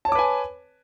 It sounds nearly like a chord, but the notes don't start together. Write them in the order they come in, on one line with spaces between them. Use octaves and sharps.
A5 C#5 D6 B4 G#5